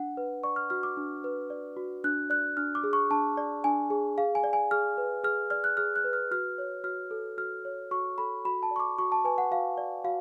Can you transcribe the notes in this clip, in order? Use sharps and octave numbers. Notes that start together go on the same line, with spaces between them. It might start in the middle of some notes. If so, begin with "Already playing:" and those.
Already playing: D4 F#5
B4
D5 C#6
F6
F#4 F6
D6
D4
B4
D5
F#4
D4 F#6
D5 F#6
D4 F6
D6
G#4
C#6
D4 A5
D5
D4 G#5
G#4
G#4 F5
G#5
D5
G#5
G#4 F6
B4
G#4 F6
D5 F6
F#6
G#4 F6
F#6
B4
F6
F#4 F6
C#5
F#4 F6
A4
F#4 F6
C#5
F#4 C#6
A4 B5
F#4 B5
A5
D5
C#6
D6
F#4 C#6
A5
B4 G#5
F#5
F#4 F5
D5
F#4 F5